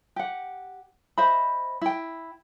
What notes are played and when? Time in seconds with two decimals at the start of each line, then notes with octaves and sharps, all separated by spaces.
0.16 G4 F#5
1.18 C5 D#5 E5 B5
1.82 E4 G5